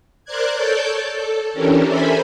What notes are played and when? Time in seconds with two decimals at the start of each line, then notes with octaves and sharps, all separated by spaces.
0.25 A#4 C5 D5 F#6 G#6
0.56 A4 C#5 D5 A5 D6 G6
1.07 A4
1.53 E3 C#4 D4 G4 A4 A#4
1.88 A4 A#4 C5 E5 G#5 B5